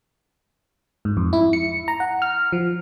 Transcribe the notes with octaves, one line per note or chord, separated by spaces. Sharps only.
G#2
F2
E4
C#7
A#5
F#5
F6
F3